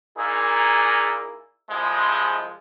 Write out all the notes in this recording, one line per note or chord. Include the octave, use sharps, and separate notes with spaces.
A#2 A#3 D#4 E4 G#4
C2 F3 G#3